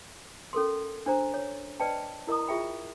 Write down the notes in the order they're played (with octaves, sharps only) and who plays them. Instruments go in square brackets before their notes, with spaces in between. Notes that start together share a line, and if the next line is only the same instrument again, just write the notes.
[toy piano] C#4 A4 A#4 C6
D4 C5 A#5
C#5
B4 D5 D#5 G5 A5
E4 A#4 D#5 A#5 D#6
F4 G#4 E5 G5 B5